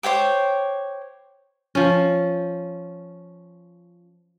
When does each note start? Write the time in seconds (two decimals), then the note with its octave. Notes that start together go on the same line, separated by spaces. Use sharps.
0.03 C5 C#5 G5 D6
1.75 F3 C#4